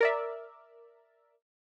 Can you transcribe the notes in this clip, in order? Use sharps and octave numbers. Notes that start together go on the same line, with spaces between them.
A#4 D5 E5